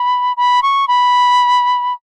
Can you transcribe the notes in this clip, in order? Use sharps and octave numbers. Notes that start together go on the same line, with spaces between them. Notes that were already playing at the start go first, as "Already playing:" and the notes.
Already playing: B5
B5
C#6
B5